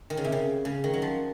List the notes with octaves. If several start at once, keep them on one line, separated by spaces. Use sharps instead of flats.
D#3
C#3
C3
C#3
C#3
D#3
F#3
F3